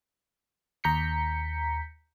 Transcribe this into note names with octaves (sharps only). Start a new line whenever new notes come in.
D#2 A#5 G6 B6 C#7